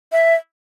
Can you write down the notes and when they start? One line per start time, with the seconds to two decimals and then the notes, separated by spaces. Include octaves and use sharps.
0.12 E5